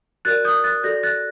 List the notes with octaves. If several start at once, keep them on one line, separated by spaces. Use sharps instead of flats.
F#4 A#4 D5 F#6 A6
D#6 G6
F#6 A6
F#4 A4 D5 G6 A#6
F#6 A6